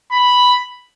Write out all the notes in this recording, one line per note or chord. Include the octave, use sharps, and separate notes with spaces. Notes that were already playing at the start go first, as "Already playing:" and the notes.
B5